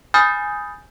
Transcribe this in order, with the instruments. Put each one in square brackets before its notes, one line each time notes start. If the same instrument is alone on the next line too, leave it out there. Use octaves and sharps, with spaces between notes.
[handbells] G#5 B5 D#6 F6 G6 A6